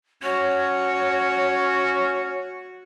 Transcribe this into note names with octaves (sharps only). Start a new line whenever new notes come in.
C#4 F#4 C#5